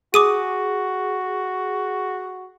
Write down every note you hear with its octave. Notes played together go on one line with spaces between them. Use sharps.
F#4 G#4 D6 D#6 D#7